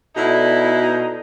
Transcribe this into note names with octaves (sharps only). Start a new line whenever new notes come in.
B2 D#4 E4 A4 D5